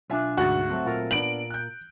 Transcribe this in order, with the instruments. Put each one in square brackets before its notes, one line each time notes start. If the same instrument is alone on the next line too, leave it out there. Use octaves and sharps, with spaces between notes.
[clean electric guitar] B1 D4 [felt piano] F4 E5 G#5
[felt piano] D2 G#2 A6 [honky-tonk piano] F#4
[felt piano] F#3 A3 C4
[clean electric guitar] A#2 F4 A#4
[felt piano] B3 D4 [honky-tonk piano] D7 F#7
[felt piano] F#6 G6